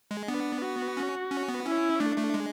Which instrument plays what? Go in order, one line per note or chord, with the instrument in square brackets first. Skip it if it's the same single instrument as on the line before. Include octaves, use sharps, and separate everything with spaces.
[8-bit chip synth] G#3
[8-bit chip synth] B3 [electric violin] D4
[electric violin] F#4
[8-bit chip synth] C#4
C#4
B3
[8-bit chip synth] C#4 [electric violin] E4
[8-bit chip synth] A3 [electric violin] D4
[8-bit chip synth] A3
G#3